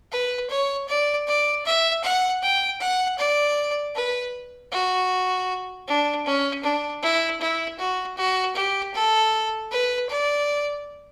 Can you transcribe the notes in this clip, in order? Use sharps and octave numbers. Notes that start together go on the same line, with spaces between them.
B4
C#5
D5
D5
E5
F#5
G5
F#5
D5
B4
F#4
D4
C#4
D4
E4
E4
F#4
F#4
G4
A4
B4
D5